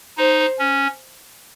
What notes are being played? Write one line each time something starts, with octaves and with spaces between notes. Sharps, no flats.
D#4 C5
C#4